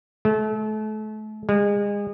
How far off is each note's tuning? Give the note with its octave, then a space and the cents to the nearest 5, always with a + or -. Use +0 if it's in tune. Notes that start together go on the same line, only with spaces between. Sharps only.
A3 -35
G#3 -30